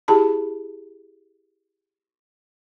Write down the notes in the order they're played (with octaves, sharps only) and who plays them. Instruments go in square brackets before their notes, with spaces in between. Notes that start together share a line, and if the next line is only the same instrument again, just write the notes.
[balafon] E4 G4 G#4 A5 B5